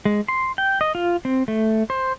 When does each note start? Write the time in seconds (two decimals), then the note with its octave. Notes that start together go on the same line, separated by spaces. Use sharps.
0.05 G#3
0.28 C6
0.58 G5
0.81 D#5
0.95 F4
1.25 C4
1.48 A3
1.90 C5